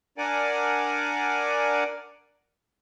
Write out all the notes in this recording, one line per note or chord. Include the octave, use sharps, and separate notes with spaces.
D4 A#4 D5 F#5 G#5 D6